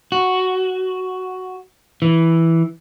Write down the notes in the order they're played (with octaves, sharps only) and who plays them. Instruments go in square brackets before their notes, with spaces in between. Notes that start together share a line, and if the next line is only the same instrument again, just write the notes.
[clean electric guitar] F#4
E3